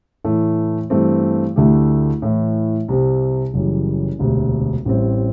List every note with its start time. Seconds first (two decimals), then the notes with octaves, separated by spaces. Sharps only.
0.24 A2 E3 A3
0.90 G2 E3 A3 C4
1.56 D2 D3 A3 E4 G4
2.22 A2 E3 A3
2.88 C2 C3 G3 C4
3.54 F#1 F#2 E3 G3
4.19 E1 D2 C3
4.85 A1 A2 G3 C4